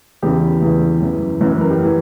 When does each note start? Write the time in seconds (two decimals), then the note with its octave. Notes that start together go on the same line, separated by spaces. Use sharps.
0.22 E2 C#3 E3 G4
0.62 E2 C#3 E3
1.01 F#2 E3
1.41 F#2 E3
1.51 B4
1.61 A#4
1.70 G4
1.84 E3